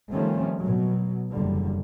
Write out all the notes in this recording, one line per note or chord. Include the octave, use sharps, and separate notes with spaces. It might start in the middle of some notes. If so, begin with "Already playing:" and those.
D#3 F3 G3 A3 C4 C#4
B2 F#3
F#1 E2 D3 G3